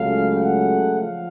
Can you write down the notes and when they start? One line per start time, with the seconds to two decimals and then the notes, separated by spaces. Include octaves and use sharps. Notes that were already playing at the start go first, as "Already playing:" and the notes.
Already playing: C#2 C#3 F#3 A3 F5
0.34 F#5
0.99 F3 F5